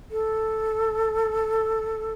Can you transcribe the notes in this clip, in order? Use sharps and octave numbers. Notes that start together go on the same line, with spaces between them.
A4